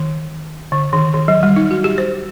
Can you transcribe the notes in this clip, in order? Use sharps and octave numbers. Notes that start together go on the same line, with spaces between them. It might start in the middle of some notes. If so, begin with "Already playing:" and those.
Already playing: D#3
D3
D#3
D#3
F#3
G3
D#4
F#4
G4
C5